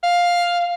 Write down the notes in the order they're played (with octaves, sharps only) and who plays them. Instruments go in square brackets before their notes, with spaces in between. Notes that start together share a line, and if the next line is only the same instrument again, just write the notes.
[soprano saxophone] F5